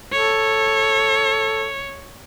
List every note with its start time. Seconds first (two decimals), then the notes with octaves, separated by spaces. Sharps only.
0.13 A4 C#5